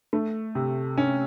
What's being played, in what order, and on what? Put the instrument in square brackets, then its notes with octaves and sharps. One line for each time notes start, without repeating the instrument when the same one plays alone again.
[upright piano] A3
C3
C#4